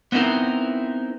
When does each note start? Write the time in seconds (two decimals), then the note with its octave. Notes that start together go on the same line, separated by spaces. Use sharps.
0.12 B3 C4 D#4 E4 A#4